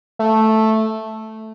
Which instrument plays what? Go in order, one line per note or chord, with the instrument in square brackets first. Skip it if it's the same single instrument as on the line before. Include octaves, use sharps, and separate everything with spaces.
[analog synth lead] A3